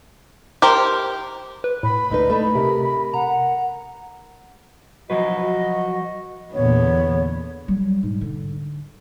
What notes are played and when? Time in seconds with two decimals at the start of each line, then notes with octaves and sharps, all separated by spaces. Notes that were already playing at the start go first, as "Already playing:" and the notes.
0.62 G4 A#4 C5
1.64 B4
1.83 A2 B5
2.10 D2 D#4 B4
2.30 A3 D#4 B5
2.55 C3 A#4
3.14 F#5 A#5
5.10 F3 F#3 F#4 B4 D#5
6.54 E2 A#2 D3 B3 C#5
7.68 F#3 G3
8.03 G#2
8.21 D3